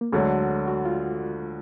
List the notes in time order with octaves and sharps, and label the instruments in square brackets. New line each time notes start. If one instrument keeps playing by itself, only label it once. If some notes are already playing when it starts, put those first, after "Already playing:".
[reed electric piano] A#3
[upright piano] D2 D3 F#3 [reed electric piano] G#3
[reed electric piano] F#4
F4